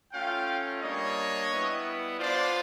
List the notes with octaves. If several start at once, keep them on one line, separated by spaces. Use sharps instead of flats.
A3 C#4 F4 F5 G5
G3 A#3 D4 C#5 D#5
G3 B3 E4
B3 D4 F4 C5 D5